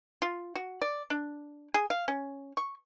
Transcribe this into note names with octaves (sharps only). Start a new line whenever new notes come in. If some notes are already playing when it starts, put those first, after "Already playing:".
F4
F#4
D5
D4
G#4
F5
C#4
C#6